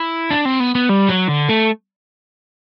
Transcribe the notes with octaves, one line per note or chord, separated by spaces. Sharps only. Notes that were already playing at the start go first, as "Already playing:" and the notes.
Already playing: E4
D4
C4
B3
B3
G3
F#3
D3
A3